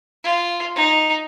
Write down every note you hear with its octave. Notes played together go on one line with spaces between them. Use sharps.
F4
D#4